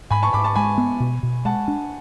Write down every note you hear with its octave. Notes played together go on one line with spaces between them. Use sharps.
G#2 G#5 B5
A5 C#6
G#2 B5 D6
A5 C#6
G#3 G#5 B5
B3
B2
B2
G#3 F#5 A5
D4